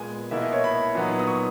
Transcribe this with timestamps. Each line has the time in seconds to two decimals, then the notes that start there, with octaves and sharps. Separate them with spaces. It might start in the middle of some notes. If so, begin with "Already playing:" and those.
Already playing: A#2 G#3 B3 G#5
0.31 B2 A#3 E4 E5
0.42 D#5
0.53 C#5
0.64 B5
0.95 A#2 F#3 B3 D#4
1.19 D#6
1.28 C#6